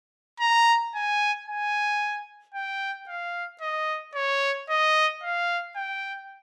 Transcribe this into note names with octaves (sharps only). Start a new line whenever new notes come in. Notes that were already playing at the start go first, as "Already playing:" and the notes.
A#5
G#5
G#5
G5
F5
D#5
C#5
D#5
F5
G5